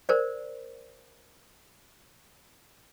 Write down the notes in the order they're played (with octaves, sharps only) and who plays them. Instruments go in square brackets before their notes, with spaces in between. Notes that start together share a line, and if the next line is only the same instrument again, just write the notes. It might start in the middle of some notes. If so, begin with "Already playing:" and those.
[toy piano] A#4 C5 D5